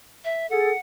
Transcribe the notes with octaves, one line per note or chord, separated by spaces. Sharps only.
E5
G#4 A4 F#5